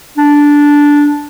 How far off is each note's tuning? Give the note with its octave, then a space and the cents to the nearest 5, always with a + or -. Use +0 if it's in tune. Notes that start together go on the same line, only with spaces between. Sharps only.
D4 -10